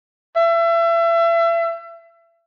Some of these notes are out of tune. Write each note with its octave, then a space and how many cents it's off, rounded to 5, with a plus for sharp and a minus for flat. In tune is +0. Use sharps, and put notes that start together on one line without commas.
E5 +30